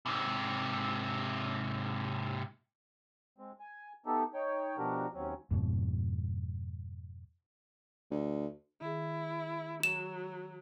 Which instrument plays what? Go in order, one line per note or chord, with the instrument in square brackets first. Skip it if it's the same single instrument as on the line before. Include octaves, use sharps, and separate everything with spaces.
[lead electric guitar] G#2 C3
[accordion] G#3 C4
G#5
A3 B3 D#4 G4 A4
D#4 C#5 G5
B2 F3 D4 F#4 G4 A#4
D#2 F#3 C4 C#4
[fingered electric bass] F2 G#2 B2
[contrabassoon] D2
[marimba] D#3 G#4 [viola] E4
[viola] F#3 [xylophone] E7